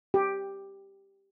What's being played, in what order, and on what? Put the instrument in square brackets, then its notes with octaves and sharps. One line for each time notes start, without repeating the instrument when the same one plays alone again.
[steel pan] G4